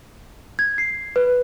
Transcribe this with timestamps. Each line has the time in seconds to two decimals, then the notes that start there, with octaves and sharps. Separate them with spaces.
0.59 G#6
0.78 C7
1.16 B4